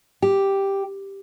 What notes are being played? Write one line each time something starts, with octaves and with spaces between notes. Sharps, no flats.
G4